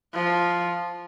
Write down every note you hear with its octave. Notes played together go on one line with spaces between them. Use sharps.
F3